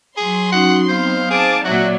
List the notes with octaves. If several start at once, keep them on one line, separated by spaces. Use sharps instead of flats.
F#3 G#4 C6
C#4 D#4 F#4 F#5
B3 C4 D#4 C5 F5
G#4 C5 A5 D6
A#2 F#3 F#4 D5 E5